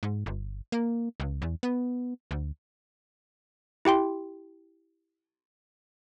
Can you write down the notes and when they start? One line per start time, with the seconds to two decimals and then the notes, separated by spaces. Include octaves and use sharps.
0.03 G#2
0.26 G1
0.72 A#3
1.20 C#2
1.42 E2
1.63 B3
2.31 D2
3.85 E4 G4 G5 C6